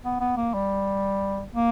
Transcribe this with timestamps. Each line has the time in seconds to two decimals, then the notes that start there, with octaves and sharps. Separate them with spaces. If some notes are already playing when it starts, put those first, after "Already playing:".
0.04 B3
0.20 B3
0.37 A#3
0.54 G3
1.54 A#3